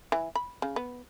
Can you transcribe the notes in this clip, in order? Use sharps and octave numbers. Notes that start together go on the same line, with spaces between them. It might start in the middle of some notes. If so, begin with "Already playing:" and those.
E3
B5
C#3
B3